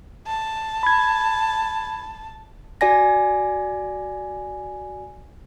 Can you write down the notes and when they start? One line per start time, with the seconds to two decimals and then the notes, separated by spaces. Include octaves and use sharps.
0.27 A5
0.83 B5 G#6
2.81 F#4 D5 G#5 A#6